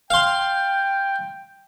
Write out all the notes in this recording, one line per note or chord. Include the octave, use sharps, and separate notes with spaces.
F5 G5 C6